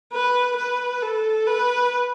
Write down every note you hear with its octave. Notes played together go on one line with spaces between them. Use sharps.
B4
B4
A4
B4